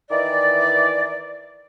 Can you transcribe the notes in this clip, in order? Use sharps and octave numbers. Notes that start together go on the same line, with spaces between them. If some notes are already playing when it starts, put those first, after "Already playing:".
D#3 E3 D5